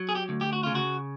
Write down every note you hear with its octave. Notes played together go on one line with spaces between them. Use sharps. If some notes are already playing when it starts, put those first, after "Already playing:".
Already playing: F#3
G#4
G4
D2
G4
F#4
C#3 F4
F#4